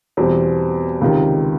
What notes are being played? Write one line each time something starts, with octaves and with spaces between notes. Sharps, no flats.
E2 B2 G3 C4
C#2 C3 D#3